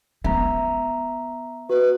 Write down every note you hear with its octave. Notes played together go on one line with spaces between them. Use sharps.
B3 E5 A#5
F#4 B4